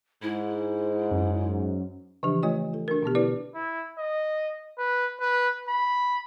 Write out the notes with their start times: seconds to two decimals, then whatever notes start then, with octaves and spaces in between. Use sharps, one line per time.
0.22 G#2 E4
1.11 F#2
2.23 C#3 E3 F3 D4 G4
2.43 A3 F4 C#5 D#5
2.73 F4 A4
2.88 D4 F#4 A#4
3.03 B2 D3 B3 G4
3.15 E4 B4 D5
3.55 E4
3.98 D#5
4.78 B4
5.20 B4
5.68 B5